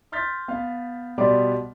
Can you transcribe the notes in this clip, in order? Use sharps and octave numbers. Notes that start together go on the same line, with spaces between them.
C6 F6 G6 A6 B6
B3 F5
B2 G3 B3 D5 C6 D6